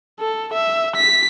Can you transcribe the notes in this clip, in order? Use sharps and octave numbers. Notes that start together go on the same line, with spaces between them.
A4
E5
B6